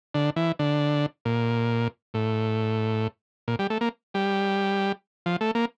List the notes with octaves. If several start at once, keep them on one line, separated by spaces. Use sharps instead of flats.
D3
E3
D3
A#2
A2
A#2
G3
A3
A#3
G3
F3
A3
A#3